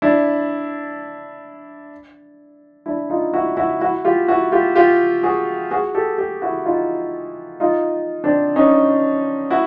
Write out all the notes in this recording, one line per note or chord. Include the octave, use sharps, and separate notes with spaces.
D4 E4
D4 E4
D#4 F4
E4 F#4
E4 F#4
E4 F#4
F4 G4
E4 F#4
F4 G4
F4 G4
F#4 G#4
F#4 G#4
G4 A4
G4 A4
E4 F#4
D#4 F4
D#4 F4
C4 D4
C#4 D#4
E4 F#4